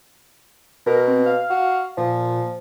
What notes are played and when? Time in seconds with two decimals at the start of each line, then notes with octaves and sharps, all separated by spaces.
0.87 B2 A#4
1.08 C4
1.26 F5
1.50 F#4
1.97 A#2 F3